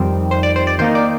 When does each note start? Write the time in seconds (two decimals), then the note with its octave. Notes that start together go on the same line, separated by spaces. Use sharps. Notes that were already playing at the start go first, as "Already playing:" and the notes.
Already playing: F2 D#3 G3 C4
0.31 C5
0.43 D5
0.56 C5
0.67 D5
0.79 D#3 A#3 D#4 C5
0.95 D5